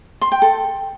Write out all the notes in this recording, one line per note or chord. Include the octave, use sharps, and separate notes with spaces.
C6
G5
A4